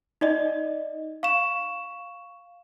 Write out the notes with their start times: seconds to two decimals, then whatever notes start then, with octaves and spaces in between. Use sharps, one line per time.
0.21 D#4 D5 D#5
1.23 F5 C#6 E7